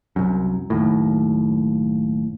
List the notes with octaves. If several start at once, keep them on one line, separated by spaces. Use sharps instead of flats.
C2 F#2
F#1 D#2 A2